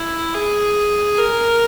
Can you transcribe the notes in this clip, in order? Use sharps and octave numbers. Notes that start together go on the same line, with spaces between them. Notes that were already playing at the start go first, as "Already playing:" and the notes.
Already playing: E4
G#4
A#4